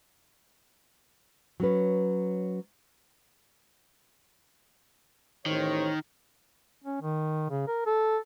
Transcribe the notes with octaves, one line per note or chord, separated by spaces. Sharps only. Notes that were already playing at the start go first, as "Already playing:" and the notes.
F#3 C#4 B4
A1 D#3 C5 C#5
C#4
D#3
C#3
A#4
A4